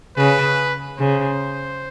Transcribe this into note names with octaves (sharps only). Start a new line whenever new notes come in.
C#3 B4
C#3 C5